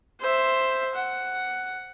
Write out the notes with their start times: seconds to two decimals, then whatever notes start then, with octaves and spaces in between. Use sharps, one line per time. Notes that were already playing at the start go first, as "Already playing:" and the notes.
0.20 C5 E5
0.95 F#5